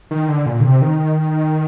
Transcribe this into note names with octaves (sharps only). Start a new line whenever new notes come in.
D#3
D3
A#2
D3
C3
D#3